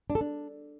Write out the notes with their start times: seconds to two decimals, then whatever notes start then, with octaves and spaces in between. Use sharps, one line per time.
0.10 D4
0.15 A4
0.21 D4